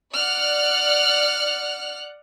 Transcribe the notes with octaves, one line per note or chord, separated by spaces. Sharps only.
D5 F#5 F6 F#6